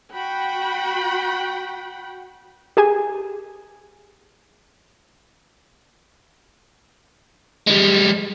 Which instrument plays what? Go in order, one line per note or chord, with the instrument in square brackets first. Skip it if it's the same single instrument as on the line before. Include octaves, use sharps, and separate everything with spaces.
[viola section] F#4 F#5 G5 B5
[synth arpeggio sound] G4 G#4 G#5
[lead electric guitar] G3 G#3